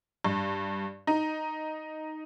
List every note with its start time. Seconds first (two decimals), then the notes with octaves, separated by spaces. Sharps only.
0.25 G2
1.07 D#4